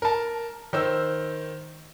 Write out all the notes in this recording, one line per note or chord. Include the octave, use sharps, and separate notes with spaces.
A#4 A5
D#3 C5 E6